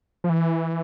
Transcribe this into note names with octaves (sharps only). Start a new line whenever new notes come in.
F3
E3